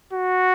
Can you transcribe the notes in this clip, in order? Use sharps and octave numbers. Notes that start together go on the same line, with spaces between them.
F#4